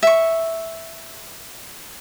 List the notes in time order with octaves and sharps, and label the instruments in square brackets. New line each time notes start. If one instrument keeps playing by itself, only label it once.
[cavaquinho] E5 C#6